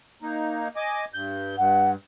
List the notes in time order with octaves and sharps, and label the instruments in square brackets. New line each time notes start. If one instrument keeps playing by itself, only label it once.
[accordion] A#3 D#4
D#5 G#5 D6
G2 G6
[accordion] G2 [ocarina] F#5